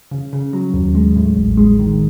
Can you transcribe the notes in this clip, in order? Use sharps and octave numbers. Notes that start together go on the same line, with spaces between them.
C#3
C#3
F#3
D#2
G#3
A2
A1
G#3
D#3